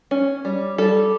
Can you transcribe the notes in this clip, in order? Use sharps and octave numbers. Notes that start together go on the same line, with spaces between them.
C#4
G3
G3 A4